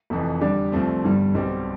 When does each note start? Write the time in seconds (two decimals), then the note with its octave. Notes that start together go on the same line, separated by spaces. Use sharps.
0.10 F1 F2 E3
0.41 D3 G3 D4 G4
0.72 C2 C3 F3 A3 C4
1.03 G1 G2 D3 G3
1.35 B1 B2 G3 C4 G4